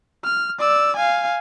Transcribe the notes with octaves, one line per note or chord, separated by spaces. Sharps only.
F6
D5 E6
F5 G#5